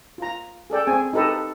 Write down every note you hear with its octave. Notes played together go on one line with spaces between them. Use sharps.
F4 A#5
G#4 A4 D5 G5
C4 G#4 G#5
D#4 G4 A4 B4 D#5